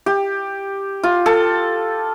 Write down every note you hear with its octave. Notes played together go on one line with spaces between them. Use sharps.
G4
F4
A4